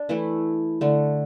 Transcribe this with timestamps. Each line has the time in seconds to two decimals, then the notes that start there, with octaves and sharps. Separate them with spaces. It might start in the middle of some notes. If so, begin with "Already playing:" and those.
Already playing: D4
0.09 E3 A3 E4
0.81 D3 A3